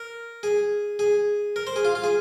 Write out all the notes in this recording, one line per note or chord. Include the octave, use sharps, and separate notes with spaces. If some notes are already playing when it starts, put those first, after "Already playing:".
Already playing: A#4
G#4
G#4
A#4
C5
G#4
F4
F4
G#4